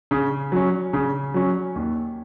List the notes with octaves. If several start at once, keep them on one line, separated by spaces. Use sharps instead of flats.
C#3
F#3 C#4
C#3
F#3 C#4
D#2